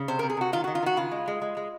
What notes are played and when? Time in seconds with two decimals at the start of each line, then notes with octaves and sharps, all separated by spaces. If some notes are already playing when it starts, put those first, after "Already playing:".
Already playing: C#3
0.08 C3 C5
0.19 C3 A#4
0.30 G#4
0.37 C3 F#4
0.53 D#3 F4
0.64 D#3 F#4
0.75 F4
0.82 D#3 F#4
0.96 C#3 F4
1.11 G#3
1.28 G#3
1.42 G#3
1.57 G#3